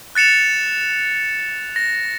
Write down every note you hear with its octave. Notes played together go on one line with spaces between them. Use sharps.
F#6 A6 C#7 E7 F7
A#6